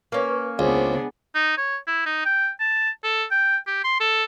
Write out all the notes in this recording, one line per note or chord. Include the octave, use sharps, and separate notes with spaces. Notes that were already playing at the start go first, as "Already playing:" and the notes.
A#3 C#4 B4 C#6
C#2 B3 D4 G#4 C5
D#4
C#5
E4
D#4
G5
A5
A4
G5
G4
C6
A4